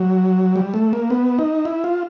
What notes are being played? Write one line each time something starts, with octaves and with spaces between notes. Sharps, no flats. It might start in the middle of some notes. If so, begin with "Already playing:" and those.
Already playing: F#3
G3
A3
A#3
B3
D#4
E4
F4